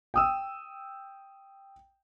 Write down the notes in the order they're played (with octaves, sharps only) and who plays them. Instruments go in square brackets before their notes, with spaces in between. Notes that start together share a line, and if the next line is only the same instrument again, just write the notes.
[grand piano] G5 D#6 E6